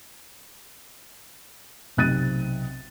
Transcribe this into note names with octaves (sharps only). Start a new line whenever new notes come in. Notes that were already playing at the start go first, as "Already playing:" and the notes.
B1 C3 F#6 A6 D#7